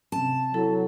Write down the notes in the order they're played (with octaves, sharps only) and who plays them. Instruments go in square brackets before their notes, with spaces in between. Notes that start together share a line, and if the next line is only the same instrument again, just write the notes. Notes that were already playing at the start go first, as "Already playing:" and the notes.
[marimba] C3 C4 C#4 [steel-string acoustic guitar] A5
[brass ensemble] F#3 [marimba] E4 [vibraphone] A4